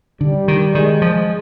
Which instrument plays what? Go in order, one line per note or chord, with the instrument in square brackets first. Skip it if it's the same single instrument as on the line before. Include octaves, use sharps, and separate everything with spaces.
[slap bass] D3 [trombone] G3
[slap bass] D#3
[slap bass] D#3 [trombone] G#3
[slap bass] F3